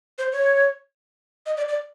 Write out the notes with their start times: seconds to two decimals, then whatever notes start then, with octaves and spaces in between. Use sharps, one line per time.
0.18 C5
0.32 C#5
1.46 D#5
1.57 D5
1.68 D5